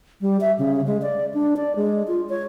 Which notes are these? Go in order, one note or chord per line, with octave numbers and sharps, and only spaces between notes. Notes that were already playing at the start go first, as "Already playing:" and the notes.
G3
E5
C#3
G#3
D5
D4
D5
G#3
F4
C#5